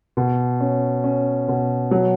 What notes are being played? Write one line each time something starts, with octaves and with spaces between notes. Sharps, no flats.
B2
C#4
C#4
B2
F#3